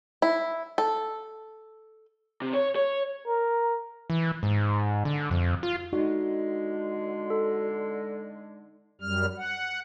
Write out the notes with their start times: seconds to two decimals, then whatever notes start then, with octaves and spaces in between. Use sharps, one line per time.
0.22 E4
0.78 A4
2.42 C3
2.54 C#5
2.76 C#5
3.27 A#4
4.10 E3
4.43 G#2
5.05 D3
5.31 F2
5.63 F4
5.93 D3 G#3 D#4 F#4
7.30 A4
9.01 F#2 G3 F6
9.37 F#5